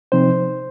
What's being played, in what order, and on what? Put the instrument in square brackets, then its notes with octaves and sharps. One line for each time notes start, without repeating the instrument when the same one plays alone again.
[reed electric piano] C3 F3 C4 D#4 C5